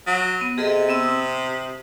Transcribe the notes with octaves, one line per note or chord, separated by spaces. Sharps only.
F#3
B3
C3 G#4 A4 D#5
B3 C4 E6
D#6